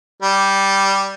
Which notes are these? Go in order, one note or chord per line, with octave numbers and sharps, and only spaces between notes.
G3